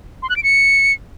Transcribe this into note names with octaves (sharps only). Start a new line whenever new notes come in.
C6
F#6
D7
C#7